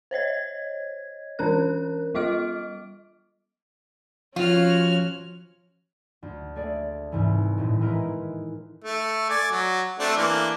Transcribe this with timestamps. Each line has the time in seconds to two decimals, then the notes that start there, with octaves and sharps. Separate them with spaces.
0.11 C5 C#5 D#5 G#6
1.39 E3 C#4 D4 A#4 F#6
2.15 G3 F4 D#5 D6 F6 D7
4.36 F3 C#4 F4 F#4 F6
6.22 D2
6.55 A3 G#4 D5
7.12 C2 G#2 E3
7.58 D#1 A2
7.81 E3 G#3 D#4 A#4 B4
8.84 A3
9.30 D5 G#5
9.51 F#3
9.99 A3 C4 D4
10.17 E3 A#3 D4